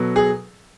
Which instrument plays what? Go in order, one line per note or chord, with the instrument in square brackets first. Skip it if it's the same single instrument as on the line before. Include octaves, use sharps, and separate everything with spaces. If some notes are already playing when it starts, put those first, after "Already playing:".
Already playing: [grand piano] B2 F#3 B3 A4
G#4